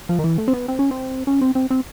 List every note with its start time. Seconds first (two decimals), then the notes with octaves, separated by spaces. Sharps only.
0.09 F3
0.19 D#3
0.24 E3
0.38 A3
0.48 C4
0.53 B3
0.68 C4
0.79 C#4
0.91 C4
1.27 C#4
1.41 C4
1.55 C4
1.70 C4